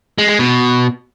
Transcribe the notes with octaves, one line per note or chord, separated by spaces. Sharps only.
G#3
G#3
B2